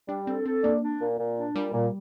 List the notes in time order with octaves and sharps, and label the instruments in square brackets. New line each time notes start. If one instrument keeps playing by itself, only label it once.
[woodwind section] G3 [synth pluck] D4
[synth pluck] C4 [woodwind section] A4
[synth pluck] C4 [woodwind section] A4
[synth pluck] A#3 [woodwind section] D4
[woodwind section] D4
A#2
A#2
D4
[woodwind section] A#2 [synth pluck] G3
[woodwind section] A#2